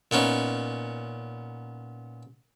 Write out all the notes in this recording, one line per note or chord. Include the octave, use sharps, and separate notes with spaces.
A#2 B3 C#4 D#4